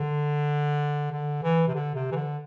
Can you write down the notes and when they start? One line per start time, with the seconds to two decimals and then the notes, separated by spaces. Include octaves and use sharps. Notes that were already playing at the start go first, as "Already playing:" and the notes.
Already playing: D3
1.11 D3
1.43 E3
1.68 C3
1.74 D3
1.95 C3
2.11 E3
2.15 D3